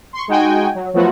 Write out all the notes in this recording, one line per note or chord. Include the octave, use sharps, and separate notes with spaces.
C6 C#6
G#3 D#4 F#4 G5 G#5
F#3
F3 F#3 A3 B3 F4 F#4